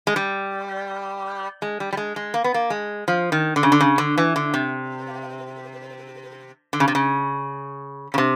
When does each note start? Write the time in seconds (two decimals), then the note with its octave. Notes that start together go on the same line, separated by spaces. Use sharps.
0.07 G#3
0.16 G3
1.62 G#3
1.80 G3
1.93 G3
1.97 G#3
2.16 G#3
2.34 A#3
2.44 B3
2.54 A#3
2.70 G#3
3.08 F3
3.32 D#3
3.56 D3
3.63 C#3
3.72 D3
3.81 C#3
3.98 D3
4.18 E3
4.36 D3
4.54 C3
6.73 D3
6.80 C#3
6.88 C3
6.95 C#3
8.14 C#3
8.18 C3